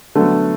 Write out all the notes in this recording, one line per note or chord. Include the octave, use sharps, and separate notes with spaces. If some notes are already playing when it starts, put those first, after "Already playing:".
D3 F#3 A3 B3 A4